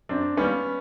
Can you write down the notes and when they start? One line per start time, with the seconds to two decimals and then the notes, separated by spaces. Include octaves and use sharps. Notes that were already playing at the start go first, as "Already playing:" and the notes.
0.09 F#2 C4 D4
0.37 D#3 G3 A#3 B3 C#4